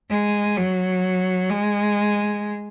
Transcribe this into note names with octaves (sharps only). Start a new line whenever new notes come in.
G#3
F#3
G#3